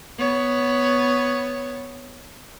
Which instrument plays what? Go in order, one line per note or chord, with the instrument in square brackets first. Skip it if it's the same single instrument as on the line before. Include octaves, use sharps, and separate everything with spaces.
[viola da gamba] B3 C#5